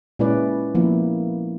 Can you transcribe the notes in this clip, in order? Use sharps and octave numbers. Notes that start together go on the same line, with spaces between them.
A#2 G#3 C#4 E4 B4 D5
F3 A#3 B3 E4